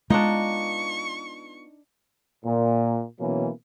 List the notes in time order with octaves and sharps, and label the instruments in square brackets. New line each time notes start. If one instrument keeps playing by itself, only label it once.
[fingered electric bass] G#3 [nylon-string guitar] B3 F4 [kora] D4 D#4 [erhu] C#6
[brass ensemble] A#2
B2 E3 F#3 A#3 C#4